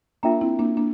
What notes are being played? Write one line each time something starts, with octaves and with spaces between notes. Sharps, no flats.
A#3 D4 F4 A#4 E5 G5 A#5
C4 E4
A#3 D4
A#3 D4